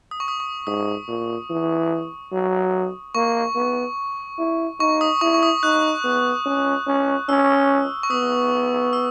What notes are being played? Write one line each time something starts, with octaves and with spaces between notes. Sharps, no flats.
D#6
C#6
D#6
C#6
G#2 D#6
A#2
E3
F#3
A#3 C#6
B3
E4
D#4 C#6
D#6
E4 C#6
C#6
D#6
D#4 F#6
B3
C#4
C#4
C#4 E6
C#6
B3 D#6
E6